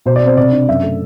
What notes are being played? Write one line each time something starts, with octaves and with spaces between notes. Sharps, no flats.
B2 C5
D5
C4 C5
C3 D5
D4
F#2 E5
A3